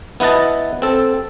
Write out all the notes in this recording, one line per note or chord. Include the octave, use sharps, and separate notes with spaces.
B3 E4 B4 D#5 A5
C4 A4